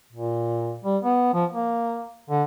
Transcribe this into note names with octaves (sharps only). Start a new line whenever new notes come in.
A#2
G3
B3
F3
A#3
D3